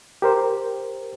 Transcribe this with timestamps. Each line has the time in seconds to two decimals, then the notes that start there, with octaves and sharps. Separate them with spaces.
0.22 G4 A#4 C5